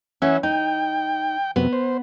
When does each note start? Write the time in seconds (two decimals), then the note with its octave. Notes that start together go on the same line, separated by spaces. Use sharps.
0.22 E3 C#4 E5 F#5
0.43 D#4 G5
1.56 F#2 C3 B3
1.73 C5